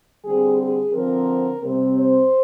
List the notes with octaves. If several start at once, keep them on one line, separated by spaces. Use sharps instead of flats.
D3 G3 C4 G#4
G#4
D3 F3 C4 A#4
C3 G3 C4
C5